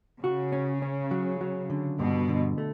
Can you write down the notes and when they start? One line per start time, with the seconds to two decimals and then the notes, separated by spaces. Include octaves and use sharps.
0.24 C#3 F#4
0.52 C#4
0.82 C#4
1.11 F#3
1.41 F#3
1.70 D3
1.99 G2 B2
2.29 D3
2.58 A3